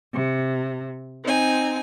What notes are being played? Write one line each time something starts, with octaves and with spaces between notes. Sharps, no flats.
C3
C4 D#4 G#5